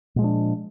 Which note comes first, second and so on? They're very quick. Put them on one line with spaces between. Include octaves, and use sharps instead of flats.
A#2 G#3 F3 D4